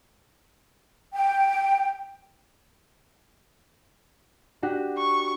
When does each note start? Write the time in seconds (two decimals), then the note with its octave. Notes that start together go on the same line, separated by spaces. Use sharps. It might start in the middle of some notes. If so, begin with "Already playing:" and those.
1.14 G5
4.62 D4 F#4 G4
4.98 C#6